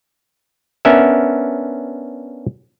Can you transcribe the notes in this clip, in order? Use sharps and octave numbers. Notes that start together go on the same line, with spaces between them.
B3 C#4 D4 A#4 E5